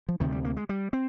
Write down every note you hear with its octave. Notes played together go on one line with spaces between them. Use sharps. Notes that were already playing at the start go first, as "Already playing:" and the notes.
F3
D2 C3 D#3
G3
A#3
G#3
G3
C4